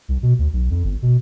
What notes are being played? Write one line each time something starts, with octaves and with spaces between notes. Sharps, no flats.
C2
B2
D2
B1
F2
G1
B2